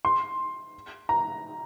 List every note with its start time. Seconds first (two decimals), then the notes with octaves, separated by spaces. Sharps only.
0.05 C6
1.09 A#5